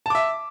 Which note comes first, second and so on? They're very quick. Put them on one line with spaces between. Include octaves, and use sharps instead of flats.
A5 D6 E5